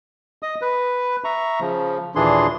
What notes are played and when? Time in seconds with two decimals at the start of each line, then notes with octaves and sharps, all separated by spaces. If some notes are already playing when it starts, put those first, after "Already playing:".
0.43 D#5 D#6
0.62 B4
1.24 E5 A#5 C#6
1.60 C#3 F3
2.15 D#2 A#2 E3 D4 G#4 C6